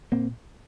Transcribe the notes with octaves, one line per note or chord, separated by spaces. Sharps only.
A#2 A#3 C4